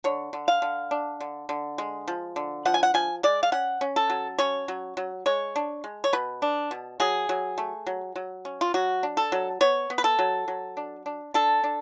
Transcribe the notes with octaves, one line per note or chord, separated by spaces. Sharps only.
D3 C#5
D3
F5
D3
D4
D3
D3
G#3
F3
D3
F3 F#5
G#5
F#5
F3 G#5
G#3 D5
F5
C#4 F#5
C#4
A4
F#3
C#4 C#5
F#3
F#3
G#3 C#5
D4
G#3
C#5
B2 B4
D4
B2
F#3 G#4
F#3
A3
F#3
F#3
C#4
F4
F#3 F#4
D4
A4
F#3
B3 C#5
B3
B4
A4
F#3
F#3
D4
D4
D4 A4
D4